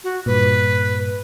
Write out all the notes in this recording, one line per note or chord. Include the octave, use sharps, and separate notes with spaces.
F#4
G2 A#2 B4